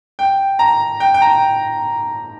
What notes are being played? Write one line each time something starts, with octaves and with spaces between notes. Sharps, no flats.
G5
A#5
G5
G5
A#5